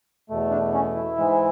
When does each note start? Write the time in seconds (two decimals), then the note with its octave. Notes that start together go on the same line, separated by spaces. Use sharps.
0.30 E2 B2 A3
0.51 D4
0.74 C#4
0.95 E4
1.17 G#2 E3 G#3